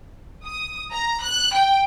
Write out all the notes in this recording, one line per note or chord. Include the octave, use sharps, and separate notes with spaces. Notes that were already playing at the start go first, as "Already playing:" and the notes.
D#6
A#5
F#6
G5